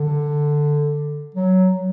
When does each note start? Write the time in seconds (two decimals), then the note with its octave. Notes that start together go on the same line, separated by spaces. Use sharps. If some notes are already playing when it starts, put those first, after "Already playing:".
Already playing: D3
1.35 F#3